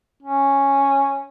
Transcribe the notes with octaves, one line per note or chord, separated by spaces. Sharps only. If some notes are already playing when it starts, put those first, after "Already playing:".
C#4